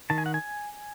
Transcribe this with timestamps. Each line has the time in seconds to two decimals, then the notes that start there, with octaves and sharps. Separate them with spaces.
0.10 D#3 A5
0.18 G#5
0.26 F#5
0.34 G#5